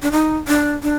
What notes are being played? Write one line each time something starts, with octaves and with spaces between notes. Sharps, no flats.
D4
D#4
D4
D4